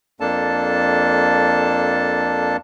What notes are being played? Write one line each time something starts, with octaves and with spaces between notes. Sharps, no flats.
F2 A#3 D4 A4 A5